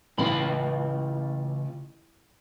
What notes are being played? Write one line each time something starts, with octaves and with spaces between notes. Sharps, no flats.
A1 C#3 F4 B5